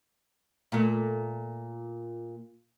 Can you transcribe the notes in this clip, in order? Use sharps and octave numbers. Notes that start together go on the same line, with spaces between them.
A#2 A3